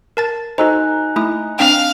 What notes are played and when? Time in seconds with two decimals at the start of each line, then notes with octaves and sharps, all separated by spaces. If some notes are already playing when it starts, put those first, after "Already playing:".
0.17 A#4 A5 A6
0.58 D#4 F#4 A4 C5 G#5 A#5 F#6
1.16 A3 E4 D#6
1.59 C4 D4 F5 G5